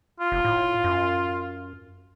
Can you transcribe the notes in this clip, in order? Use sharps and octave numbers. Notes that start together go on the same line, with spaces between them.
F4
F1
A2
F#2